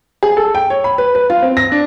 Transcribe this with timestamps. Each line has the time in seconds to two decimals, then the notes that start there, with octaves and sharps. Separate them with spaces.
0.23 G#4
0.37 A4
0.55 G5
0.70 C#5
0.84 B5
0.98 B4
1.15 B4
1.30 F4
1.42 C4
1.57 A#6
1.72 D4